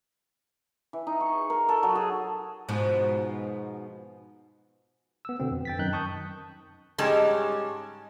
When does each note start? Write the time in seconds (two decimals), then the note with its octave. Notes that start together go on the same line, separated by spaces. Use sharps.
0.93 E3
1.07 D#4
1.20 C#6
1.32 G#4
1.50 A#4
1.69 A4
1.83 F#3
1.95 G#4
2.68 G#2 B2 F3
5.25 B3 E6
5.40 B2 D3 B3 C4
5.51 F2
5.65 G5 A6 B6
5.79 F#2 D#3 D#4 F#6 G6
5.93 A5 C#6 D#6 G6
6.98 G#2 G3 G#3 C#4 A5